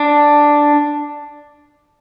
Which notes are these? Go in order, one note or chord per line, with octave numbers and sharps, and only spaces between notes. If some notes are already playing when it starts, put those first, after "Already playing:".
Already playing: D4